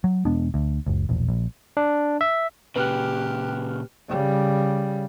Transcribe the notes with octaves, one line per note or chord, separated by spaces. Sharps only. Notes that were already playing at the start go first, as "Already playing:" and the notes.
F#3
E1 G#3 B3 D4
D2
F#1 C#2
E1 A#1
A#1
D4
E5
A#2 C#3 G4 B4 F6 F#6
C#3 G3